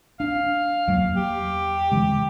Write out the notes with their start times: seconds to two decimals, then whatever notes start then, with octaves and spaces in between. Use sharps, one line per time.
0.20 D4 F5
0.87 E2 F#3 A#3
1.16 G4
1.92 D3 E3 G#3